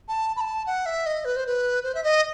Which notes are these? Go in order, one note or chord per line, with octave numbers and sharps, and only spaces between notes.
A5
B5
A5
F#5
E5
D#5
B4
C5
B4
C5
E5
D#5